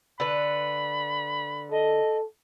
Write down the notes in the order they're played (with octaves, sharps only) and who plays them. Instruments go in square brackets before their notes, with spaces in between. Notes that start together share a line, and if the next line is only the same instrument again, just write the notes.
[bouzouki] D3 B4 [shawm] B5
[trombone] A4 [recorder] D#5